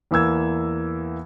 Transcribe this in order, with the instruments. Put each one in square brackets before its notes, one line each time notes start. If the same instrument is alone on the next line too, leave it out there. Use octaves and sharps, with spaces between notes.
[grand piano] E2 E3 A#3 E6 G#6